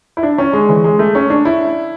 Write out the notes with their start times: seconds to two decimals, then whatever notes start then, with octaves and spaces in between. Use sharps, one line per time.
0.17 E4
0.23 D4
0.38 C#4
0.53 G#3
0.69 E3
0.84 G#3
0.99 A3
1.15 C#4
1.30 D4
1.45 E4